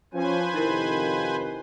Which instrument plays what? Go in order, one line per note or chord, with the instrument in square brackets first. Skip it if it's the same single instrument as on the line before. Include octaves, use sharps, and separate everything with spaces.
[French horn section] F3 [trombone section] C#4 [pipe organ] B4 C5 G#5
[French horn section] F2 [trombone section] C3 D#3 [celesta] D#4 E4 A#4